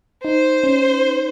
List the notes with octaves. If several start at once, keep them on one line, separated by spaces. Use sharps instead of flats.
D#4 C5
C#4